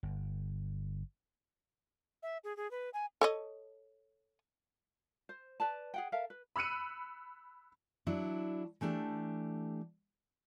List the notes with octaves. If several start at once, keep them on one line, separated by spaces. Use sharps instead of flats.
G1
E5
G#4
G#4
B4
G#5
A4 C#5 D#5
C5
B4 D5 A5
G#4 F#5 G5
A4 A#4 E5 F5
B4
B5 E6 F#6 C#7 D#7
F#3 D4 E4
E3 A3 D4 G4 A5